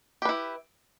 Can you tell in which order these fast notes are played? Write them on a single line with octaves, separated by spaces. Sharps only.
G4 B4 E4